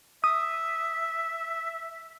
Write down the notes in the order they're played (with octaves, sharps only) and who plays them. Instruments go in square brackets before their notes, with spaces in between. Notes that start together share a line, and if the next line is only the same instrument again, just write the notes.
[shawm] E5 [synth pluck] D#6